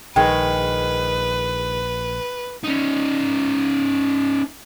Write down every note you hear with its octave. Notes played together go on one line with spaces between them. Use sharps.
A#1 D#3 G#3 B4 G5
C#4 D#4